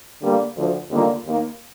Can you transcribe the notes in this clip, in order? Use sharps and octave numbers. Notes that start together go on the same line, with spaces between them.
D3 G3 A#3
D2 D3 F3
D#2 D3 G3 A#3 F4
D#2 D#3 A#3